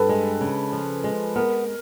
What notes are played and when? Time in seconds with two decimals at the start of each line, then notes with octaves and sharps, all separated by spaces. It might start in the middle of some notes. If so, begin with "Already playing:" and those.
Already playing: G2 A4 B4
0.09 G#3
0.41 C#3
0.72 F3
1.04 G#3
1.36 B3 A#4